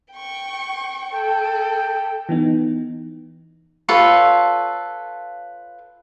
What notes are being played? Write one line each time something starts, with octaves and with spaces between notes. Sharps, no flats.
G5 C#6
A4 G5
E3 B3 D#4
F4 A4 B4 C#5